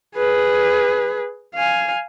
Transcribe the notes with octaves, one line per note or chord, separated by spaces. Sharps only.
G#4 B4
F5 G#5